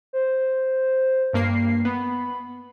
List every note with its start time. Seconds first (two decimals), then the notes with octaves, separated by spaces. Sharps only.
0.13 C5
1.33 G2 A#3 C7
1.85 B3 B5